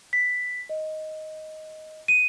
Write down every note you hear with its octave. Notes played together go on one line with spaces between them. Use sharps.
B6
D#5
D#7